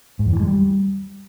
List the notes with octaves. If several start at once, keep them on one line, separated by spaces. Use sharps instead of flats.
G#2
E2
E3
G#3
G3